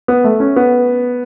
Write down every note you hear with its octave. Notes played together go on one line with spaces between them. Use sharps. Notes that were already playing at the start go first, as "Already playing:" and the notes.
B3
A3
C#4
B3